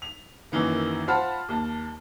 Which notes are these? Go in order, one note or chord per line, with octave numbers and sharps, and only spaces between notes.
F7
F#2 D#3 E3 A#3
F4 C5 F#5 A5 B5 F6
D#2 A5